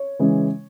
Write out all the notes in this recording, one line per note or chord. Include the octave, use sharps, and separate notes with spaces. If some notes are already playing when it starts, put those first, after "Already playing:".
Already playing: C#5
C#3 E3 G#3 C#4